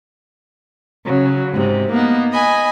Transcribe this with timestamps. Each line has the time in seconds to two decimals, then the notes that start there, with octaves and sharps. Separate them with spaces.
1.05 C#3 F#3
1.52 G#2 C3
1.91 A#3 B3 D#4
2.32 D#5 G#5 B5